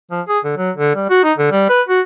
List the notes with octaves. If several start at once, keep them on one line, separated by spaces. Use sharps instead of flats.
F3
G#4
D3
F#3
D3
G3
F#4
D#4
D3
G3
B4
F#4